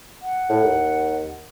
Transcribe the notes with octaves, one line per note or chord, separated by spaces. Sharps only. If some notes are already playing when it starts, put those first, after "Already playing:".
F#5
A2
D#2